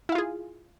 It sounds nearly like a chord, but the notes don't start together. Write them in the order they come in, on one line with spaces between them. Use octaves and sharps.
E4 F5 F4 G#4